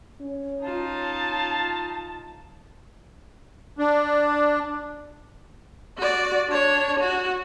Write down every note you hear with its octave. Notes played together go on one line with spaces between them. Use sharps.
C#4
D#4 F4 A5
D4
F#4 D5
D4 C#5
F#4